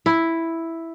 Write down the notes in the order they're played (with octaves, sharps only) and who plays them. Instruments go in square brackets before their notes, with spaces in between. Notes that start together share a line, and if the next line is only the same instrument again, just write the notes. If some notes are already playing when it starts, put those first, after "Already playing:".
[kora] E4